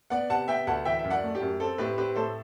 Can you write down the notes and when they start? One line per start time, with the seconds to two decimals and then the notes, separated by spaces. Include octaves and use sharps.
0.10 B3 D5 F#5
0.30 C3 F#5 A5
0.48 B3 E5 G5
0.67 D2 F#5 A5
0.85 E3 E5 G5
0.99 E5
1.04 F#2
1.11 D5 F#5
1.24 A3
1.35 G4
1.42 F#2
1.60 C4 A4
1.78 A2 G4 B4
1.97 C4 G4 B4
2.16 A2 A4 C5